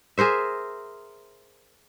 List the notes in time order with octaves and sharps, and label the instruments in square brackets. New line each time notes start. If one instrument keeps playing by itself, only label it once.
[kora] G#4 A#4 C5 E5